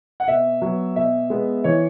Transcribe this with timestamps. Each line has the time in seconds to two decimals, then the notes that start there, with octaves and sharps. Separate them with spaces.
0.20 F#5
0.28 B2 E5
0.62 F#3 B3
0.96 B2 E5
1.30 G#3 B3
1.64 E3 C#5